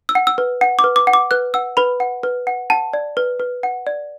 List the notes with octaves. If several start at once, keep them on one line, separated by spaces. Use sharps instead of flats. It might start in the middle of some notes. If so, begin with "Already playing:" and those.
E6
F#5
E6
B4
F#5
D6
B4
D6
F#5
D6
B4 F#6
F#5 E6
B4 B5
F#5
B4
F#5
F#5 A5
D5
B4
B4
F#5
D5